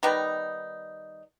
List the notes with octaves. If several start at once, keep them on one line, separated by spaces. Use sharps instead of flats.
D#3 G3 B3 D#4